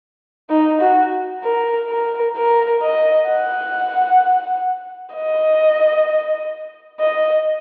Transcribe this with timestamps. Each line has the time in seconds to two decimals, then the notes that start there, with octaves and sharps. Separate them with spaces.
0.50 D#4
0.81 F#4
1.44 A#4
1.89 A#4
2.37 A#4
2.83 D#5
3.29 F#5
5.15 D#5
7.00 D#5